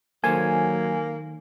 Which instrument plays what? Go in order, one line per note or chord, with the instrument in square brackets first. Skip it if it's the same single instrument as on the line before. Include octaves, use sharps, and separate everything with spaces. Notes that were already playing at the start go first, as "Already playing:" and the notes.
[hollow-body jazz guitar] D#3 A4 C5 [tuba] F#3 [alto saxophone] A#3 [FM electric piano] G#5